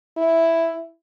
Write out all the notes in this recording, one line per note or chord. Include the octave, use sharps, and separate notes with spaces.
E4